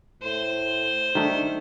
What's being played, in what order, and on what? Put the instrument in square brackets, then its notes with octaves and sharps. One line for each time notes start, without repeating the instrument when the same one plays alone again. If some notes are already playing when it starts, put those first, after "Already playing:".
[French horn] A2 [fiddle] C5
[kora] D#3 A3 [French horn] D4